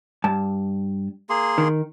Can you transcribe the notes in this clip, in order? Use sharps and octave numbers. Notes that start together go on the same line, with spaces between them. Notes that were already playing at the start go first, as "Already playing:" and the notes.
G2 A5
A#3 G#4 C6
D#3